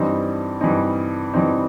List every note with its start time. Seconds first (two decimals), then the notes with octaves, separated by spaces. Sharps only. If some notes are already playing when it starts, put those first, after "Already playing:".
Already playing: G2 E3 G3 C4 D#4
0.61 G2 E3 G3 C4 D#4
1.33 G2 E3 G3 C4 D#4